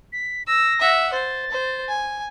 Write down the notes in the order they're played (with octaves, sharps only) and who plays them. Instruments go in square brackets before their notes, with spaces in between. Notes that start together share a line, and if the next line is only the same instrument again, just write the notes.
[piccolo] B6
[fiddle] E6 [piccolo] A#6
[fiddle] E5 F#5
[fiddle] C5 [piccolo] A6
[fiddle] C5
G#5